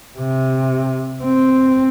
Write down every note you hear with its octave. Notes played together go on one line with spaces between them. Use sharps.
C3
C4